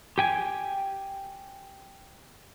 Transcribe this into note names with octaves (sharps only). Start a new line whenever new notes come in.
G4 G5 G#5